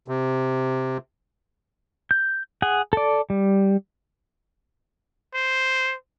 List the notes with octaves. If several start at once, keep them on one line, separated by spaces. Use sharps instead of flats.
C3
G6
G#4 F#5
A4 D5
G3
C5